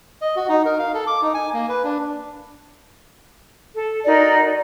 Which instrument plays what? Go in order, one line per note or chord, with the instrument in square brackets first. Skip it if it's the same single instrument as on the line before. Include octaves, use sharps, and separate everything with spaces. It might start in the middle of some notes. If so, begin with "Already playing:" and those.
[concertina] D#5
F#4
D#4
A#4
F5
A4
D6
D#4
G#5
A#3
B4
D4
[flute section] A4
D#4 F#4 A#4 D5